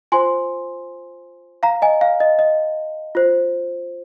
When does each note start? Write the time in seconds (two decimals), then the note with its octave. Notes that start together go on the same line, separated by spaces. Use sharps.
0.12 F4 C5 G#5 C6
1.63 F5 A#5
1.82 D#5 G#5
2.01 F5
2.20 D#5
2.39 D#5
3.15 F4 C5